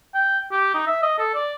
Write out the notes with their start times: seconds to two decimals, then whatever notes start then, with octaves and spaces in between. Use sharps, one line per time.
0.15 G5
0.52 G4
0.74 D#4
0.87 E5
1.02 D#5
1.19 A4
1.35 D5